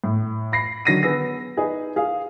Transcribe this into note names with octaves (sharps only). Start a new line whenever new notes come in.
A2
B5 A#6 C7
D3 D#3 F#3 A#6 C7 D#7
B3 G#4 E6 A#6
D#4 G#4 B4
G#4 F5